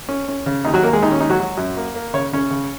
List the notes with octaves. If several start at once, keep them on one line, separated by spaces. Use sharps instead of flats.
C#4
C#4
C#3
D#2 D#4
F#3 F#4
D#2 A#3 A#4
G#3 G#4
D#2 D#4
C#4
G#3 D#4
F#3 F#4
F#3
F#2
A#3
A#3
C#3 C#5
C#3 C#4 C#5
C#3